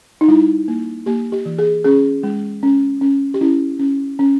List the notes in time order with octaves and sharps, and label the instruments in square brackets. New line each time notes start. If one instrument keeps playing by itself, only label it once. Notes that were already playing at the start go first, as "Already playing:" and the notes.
[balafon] D#4
G3 E4
A#3
A#3 G4
G4
E3
G#4
C#4 G#4
G#3
C#4
C#4
G4
C#4 E4
C#4
C#4